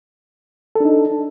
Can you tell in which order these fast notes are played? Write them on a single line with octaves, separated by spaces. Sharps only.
A4 D4 D#4